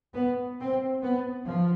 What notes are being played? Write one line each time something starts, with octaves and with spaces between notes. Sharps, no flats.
B3
C4
B3
F3